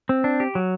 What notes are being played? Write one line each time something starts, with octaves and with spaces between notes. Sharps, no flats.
C4
D4
G4
F#3